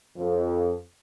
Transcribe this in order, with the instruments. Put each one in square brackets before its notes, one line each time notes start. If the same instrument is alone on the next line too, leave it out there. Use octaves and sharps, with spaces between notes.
[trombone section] F2